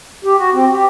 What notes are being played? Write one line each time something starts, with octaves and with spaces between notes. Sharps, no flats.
G4
F#4
C4
G4